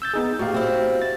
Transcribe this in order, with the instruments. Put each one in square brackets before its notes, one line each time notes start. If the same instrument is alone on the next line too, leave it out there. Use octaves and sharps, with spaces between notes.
[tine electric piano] E6 G6 A6
B3 D#4 G#4
[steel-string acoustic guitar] A2 [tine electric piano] F#4 G4 F5
[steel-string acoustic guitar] C4 E4
[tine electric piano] A6